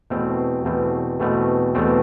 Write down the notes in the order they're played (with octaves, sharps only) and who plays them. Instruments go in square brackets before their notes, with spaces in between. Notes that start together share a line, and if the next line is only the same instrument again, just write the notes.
[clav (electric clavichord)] E2 B2 A3 C4
E2 B2 A3 C4
E2 B2 A3 C4
E2 B2 A3 C4